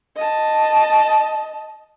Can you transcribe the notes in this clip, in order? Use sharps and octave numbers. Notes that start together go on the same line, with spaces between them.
D#5 A5